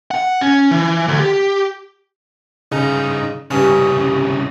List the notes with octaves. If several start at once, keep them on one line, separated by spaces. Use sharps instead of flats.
F#5
C#4
E3
D2
G4
G2 C#3 D#4
C2 G2 C#3 C#4